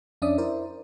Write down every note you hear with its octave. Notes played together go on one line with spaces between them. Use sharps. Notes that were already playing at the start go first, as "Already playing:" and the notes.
F2 C#4 D4 D5 E5 D#6
E4 A#4 C5 D5